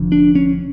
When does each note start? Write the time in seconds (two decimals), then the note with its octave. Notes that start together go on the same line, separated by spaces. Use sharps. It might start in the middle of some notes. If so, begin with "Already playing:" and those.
Already playing: F1 F2 D3
0.12 D4
0.35 C#4